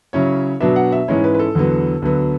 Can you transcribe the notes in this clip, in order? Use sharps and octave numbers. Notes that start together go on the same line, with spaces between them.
C#3 F#3 C#4 E4 C#5
B2 F#3 B3 D4 E5
F#5
E5
G#2 E3 G#3 C#4 E4 C#5
B4
B4
A4
E2 D3 F#3 B3
D2 D3 F#3 B3